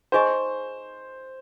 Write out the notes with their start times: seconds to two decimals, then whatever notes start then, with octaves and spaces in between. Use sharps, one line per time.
0.12 D#4 G#4 C5 D#5 G#5 C#6